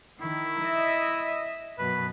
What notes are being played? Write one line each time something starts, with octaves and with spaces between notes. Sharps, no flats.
D#3 E4
D#5 E5
F#2 B2 B4